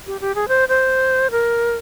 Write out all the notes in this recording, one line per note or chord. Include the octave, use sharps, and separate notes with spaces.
G4
G4
G#4
C5
C5
A#4